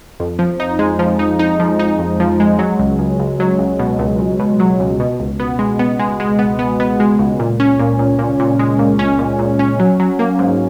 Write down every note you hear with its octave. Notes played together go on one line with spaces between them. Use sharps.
F2
F3
D#4
G#3
F3
D#4
D#4
F3
D#4
F2
F3
G#3
F#3
C#2
C#2
C#2
F#3
C#2
B2
C#2
C#2
B2
F#3
C#2
B2
C#2
B3
G#3
B3
G#3
G#3
B3
B3
B3
G#3
C#2
A#2
C#4
A#2
A#2
A#2
A#2
G#3
A#2
C#4
A#2
A#2
C#4
F#3
F#3
A#3
G#2